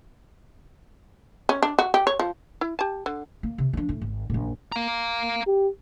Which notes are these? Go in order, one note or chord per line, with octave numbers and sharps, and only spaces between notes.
C#4
D4
F#4
G4
C#5
F3
E4
G4 A5
D3
A#3
C3
F3 D4
A2
G#1
A#1 F#2
F5 A#5
G4